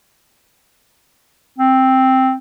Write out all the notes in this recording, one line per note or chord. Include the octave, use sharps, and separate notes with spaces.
C4